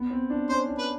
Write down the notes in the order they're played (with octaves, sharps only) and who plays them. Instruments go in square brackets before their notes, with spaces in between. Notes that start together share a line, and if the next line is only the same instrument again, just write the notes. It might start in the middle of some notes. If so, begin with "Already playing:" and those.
Already playing: [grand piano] B3
C4
D4
[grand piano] C#4 [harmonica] C5
[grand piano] D4
[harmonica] B4